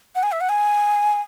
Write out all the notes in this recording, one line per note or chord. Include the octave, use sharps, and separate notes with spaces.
F#5
G#5
E5
F#5
G#5